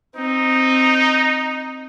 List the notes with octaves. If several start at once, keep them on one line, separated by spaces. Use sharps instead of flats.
C4 D#4